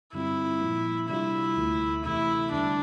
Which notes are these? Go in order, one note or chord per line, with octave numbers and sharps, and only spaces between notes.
G2 D3 G3 C4 E4 F4
A#2 F3 A#3
C3 G3 D4 E4 F4
D2 D3 A3
E2 C3 E3 A3 E4
E2 D3 G3 D4